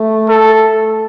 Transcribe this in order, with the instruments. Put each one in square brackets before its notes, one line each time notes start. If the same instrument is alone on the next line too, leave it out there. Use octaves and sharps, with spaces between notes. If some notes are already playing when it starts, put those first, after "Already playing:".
Already playing: [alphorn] A3
[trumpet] A4